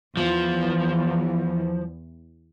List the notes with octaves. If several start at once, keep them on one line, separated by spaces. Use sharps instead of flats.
E2 F3